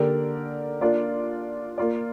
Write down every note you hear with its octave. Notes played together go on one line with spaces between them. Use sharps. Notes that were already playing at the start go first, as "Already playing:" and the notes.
Already playing: D3 A#3 G4 A#4 D5
A#3 D4 F4 D5
A#3 F4 D5